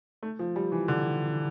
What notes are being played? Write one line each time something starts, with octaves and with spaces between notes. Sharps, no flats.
A3
F3
G3
E3
D3